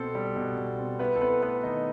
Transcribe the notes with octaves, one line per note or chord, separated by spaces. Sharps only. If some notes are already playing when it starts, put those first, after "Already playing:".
Already playing: B2 C4 A4
G3
B2
B2
C4
B3 E4 B4
A4
B3 C4 B4
A3 B3 B4
D#3 D#4 D#5